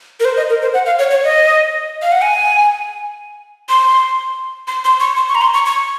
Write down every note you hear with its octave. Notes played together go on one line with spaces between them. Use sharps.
A#4
C5
D#5
A#4
C5
F#5
F5
C#5
C#5
D#5
F5
F#5
G#5
C6
C6
C6
C#6
C6
C#6
A#5
C6
C#6
C#6